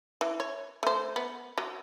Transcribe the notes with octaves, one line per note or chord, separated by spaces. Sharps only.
E3
C#5
A3 C5
B3
F#3